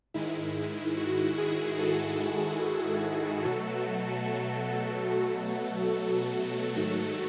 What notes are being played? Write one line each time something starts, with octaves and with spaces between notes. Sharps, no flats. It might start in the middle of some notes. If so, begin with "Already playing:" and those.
G#2 D#3 G#3 E4
F#4
E4 G#4
F#4 A4
B2 F#3 A3 F#4 A4
F#4 A4
F#4 A4
F#4 A4
G#2 D#3 F#3 A3